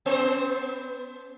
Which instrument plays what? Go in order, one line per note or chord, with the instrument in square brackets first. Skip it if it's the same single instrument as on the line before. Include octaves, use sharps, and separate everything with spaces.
[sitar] B3 C5